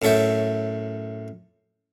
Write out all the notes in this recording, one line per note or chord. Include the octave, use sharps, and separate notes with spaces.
F#2 A2 A4 C#5 E5 G5